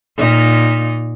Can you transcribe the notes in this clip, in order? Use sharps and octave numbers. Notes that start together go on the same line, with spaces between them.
A#2 D#4